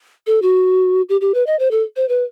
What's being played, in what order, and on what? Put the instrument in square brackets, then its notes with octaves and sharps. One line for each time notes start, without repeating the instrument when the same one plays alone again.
[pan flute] A4
F#4
G4
G4
B4
D#5
C5
A4
C5
B4